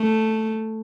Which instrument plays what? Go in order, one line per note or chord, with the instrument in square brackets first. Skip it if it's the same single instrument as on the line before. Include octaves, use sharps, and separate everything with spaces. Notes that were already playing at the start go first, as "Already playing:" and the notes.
Already playing: [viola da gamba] A3